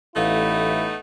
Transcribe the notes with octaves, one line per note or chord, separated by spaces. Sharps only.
A1 A3 B3 D#4 E4 A4 F5